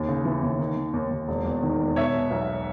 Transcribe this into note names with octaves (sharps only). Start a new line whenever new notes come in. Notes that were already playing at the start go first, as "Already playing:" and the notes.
Already playing: D#2
C#3
E3
D#2
D#3
D#3
D#2
D#2
E1
E2
D#3
E1
B2 C#5 E5
B2
B1